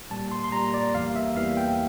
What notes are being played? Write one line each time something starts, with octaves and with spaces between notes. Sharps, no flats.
A#2 G3 A#3 A5
C6
C6
A#2 G3 A#3 A#5
D5
E2 E3 G3 A#3 F5
E5
E2 E3 G3 A#3 F5
G5